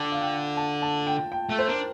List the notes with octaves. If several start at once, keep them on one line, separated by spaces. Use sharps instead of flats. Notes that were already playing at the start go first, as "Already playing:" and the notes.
Already playing: D3 G5
F5
G5
A5
A5
G5
G5
A3
C5
D4 A#4